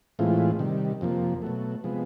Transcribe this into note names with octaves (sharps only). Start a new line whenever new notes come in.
A2 E3 G#3 C4 F4
C3 D#3 G3
F2 C3 F3 A#3
B2 F#3 A3
C3 F3 G#3 B3